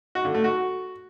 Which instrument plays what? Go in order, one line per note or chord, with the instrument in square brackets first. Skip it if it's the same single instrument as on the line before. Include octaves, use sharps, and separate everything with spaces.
[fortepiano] F#4
D3
A3
F#4